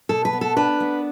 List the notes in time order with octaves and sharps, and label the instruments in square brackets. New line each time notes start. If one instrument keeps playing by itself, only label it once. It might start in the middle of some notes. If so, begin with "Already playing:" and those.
[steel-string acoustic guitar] B2 A4
B4
B3
A4
D4 B4
B3